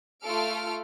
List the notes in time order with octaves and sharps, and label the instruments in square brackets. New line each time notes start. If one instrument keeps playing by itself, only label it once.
[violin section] A3 F4 A4 F6 D7